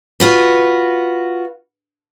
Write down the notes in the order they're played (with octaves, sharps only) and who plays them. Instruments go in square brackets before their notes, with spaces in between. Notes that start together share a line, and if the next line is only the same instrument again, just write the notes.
[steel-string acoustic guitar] F4 F#4 B4